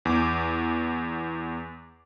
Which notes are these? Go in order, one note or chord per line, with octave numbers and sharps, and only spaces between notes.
E2 D6